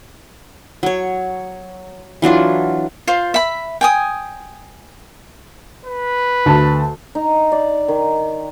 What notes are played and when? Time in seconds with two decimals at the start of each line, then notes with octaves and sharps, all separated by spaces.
0.83 F#3 C#5
2.22 E3 F#3 D4 F4
3.07 F4 C5
3.34 E5 B5
3.81 G5 G#5 D#6
5.86 B4
6.46 D2 A5
7.15 D#4
7.52 D5
7.88 D#3